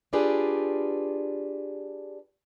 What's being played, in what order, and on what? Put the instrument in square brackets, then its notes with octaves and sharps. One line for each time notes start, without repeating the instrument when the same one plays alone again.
[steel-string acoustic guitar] D4 F4 G4 G#4 B4 D5